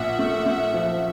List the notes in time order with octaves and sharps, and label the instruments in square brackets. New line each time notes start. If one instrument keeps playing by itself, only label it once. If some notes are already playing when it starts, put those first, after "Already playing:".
Already playing: [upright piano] A#1 [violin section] E5 F#5
[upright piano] A3
A3
F3